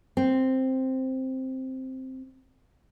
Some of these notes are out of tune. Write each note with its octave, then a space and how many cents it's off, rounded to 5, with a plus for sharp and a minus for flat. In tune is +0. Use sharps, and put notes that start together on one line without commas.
C4 +0